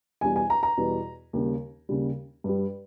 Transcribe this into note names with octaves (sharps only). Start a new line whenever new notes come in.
E2 B2 G3 G#5
G#5
A#5
A#5
E2 B2 G3
D#2 C#3 G3
D#2 C#3 G3
G2 G3